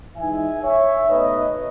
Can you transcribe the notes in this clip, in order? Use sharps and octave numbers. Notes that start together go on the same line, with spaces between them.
E3 G#3 D#4 E5 G#5
C#5 E5
B2 A3 D#4 B4 D#5